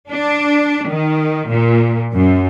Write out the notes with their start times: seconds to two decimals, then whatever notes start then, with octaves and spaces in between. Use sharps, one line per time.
0.10 D4
0.87 D#3
1.48 A#2
2.14 F#2